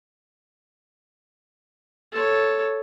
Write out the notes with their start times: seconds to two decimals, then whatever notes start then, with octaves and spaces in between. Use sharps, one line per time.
2.12 A4 C#5